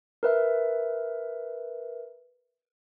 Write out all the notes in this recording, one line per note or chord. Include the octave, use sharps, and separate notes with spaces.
A#4 B4 E5